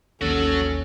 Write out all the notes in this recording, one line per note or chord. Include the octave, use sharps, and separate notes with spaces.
A1 D#2 F#3 C#4 F#4 A4